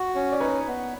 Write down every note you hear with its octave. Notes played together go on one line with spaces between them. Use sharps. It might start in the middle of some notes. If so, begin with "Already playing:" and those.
Already playing: F#4
C#4
D5
D#4 B4 C#5
B3